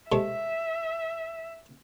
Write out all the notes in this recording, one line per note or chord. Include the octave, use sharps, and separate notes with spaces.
C3 G#3 A3 E5